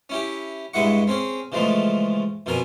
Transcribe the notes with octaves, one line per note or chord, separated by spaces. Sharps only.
C#4 E4 G4
G2 G#3 E4 D#5 F#5 C#6
C4 C#4 G#4
C#3 E3 F3 G#3 A3
F2 B2 F3 A#4 G#5